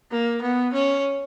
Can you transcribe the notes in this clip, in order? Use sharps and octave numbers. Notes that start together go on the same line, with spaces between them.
A#3
B3
C#4